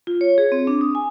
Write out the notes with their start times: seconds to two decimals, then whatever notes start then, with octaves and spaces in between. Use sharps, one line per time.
0.07 F4
0.21 C#5
0.38 G#4
0.52 C4
0.67 D4
0.81 D#6
0.95 G#5